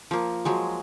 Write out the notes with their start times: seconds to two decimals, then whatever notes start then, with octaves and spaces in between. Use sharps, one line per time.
0.11 F3 A#3
0.45 F3 F#3 G#3